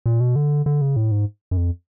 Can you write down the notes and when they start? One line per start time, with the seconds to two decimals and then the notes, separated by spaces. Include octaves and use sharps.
0.06 A#2
0.20 B2
0.36 D3
0.66 D3
0.81 C#3
0.96 A2
1.12 G#2
1.51 F#2
1.57 F2